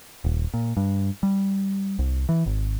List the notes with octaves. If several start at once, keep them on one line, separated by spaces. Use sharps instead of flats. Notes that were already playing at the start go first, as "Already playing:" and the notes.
D#1
A#2
G2
G3
C2
E3
G#1